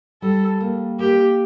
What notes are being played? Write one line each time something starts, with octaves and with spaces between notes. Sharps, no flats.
G3 A4
A#3
A#3 G4